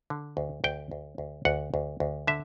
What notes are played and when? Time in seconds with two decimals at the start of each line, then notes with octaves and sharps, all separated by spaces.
0.10 D3
0.37 D2
0.64 D2 G5
0.91 D2
1.18 D2
1.45 D2 F#5
1.74 D2
2.00 D2
2.27 D3 E5